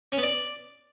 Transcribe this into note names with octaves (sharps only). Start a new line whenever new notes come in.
C#4
B3
D5